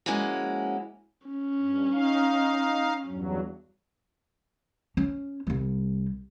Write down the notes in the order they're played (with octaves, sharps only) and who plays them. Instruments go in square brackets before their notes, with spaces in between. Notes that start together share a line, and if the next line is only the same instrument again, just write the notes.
[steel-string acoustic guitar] F3 G#3 A#3 C#4 E4 F#4
[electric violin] C#4
[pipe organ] G2
D#4 F5
E2 G2 F#3
[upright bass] C#4
C2 G3